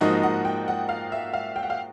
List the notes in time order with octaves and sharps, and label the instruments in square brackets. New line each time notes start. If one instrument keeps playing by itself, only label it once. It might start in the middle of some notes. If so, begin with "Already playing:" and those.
[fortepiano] G#2 F3 A#3 D#4 F#4 [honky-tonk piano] D#5
[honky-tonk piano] F#5
G5
F#5
F5
E5
F5
G5
F#5
F5